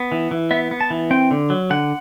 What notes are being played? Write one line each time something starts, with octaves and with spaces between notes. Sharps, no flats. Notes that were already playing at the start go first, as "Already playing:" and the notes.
Already playing: B3
E3
E3
B3 E5
B3
A5
E3
C4 G5
D3
F#3
D3 F#5